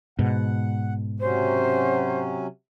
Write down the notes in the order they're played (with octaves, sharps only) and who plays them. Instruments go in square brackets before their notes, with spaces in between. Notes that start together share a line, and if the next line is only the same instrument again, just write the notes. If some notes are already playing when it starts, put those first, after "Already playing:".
[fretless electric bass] G#2 B2 [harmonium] F#5
[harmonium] C3 F#3 C#4 [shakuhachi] C5